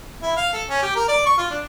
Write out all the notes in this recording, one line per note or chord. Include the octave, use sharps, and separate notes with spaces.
E4
F5
A4
C#4
G4
A#4
D5
C#6
F4
D4